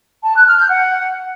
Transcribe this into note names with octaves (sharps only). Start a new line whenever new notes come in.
A5
F#6
F6
G6
F#5